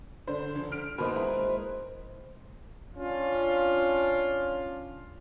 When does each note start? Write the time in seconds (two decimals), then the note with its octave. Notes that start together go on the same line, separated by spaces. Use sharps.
0.27 D3 D4 C5
0.55 F1 D3
0.72 F6 D7
0.98 B2 D#3 A#3 B4 C5 D#5
1.15 G#3 E4 A#4
2.95 C#4 D4 F4